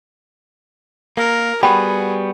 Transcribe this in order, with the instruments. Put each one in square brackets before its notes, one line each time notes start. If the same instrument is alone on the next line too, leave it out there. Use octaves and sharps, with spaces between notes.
[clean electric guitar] A#3 [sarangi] A#4
[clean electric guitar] G3 B3 F#4 [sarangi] G#4 [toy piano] G5 B5